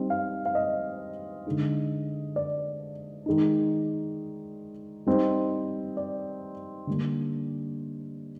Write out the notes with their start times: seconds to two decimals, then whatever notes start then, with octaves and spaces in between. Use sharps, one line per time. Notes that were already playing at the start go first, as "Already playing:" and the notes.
Already playing: G3 C4 D#4
0.10 F5
0.46 F5
0.55 D#5
1.47 D3 G#3 D#4
2.36 D5
3.26 D#3 G#3 D#4
5.06 G3 C4 D#4
5.97 D5
6.87 D3 G3 A#3 D4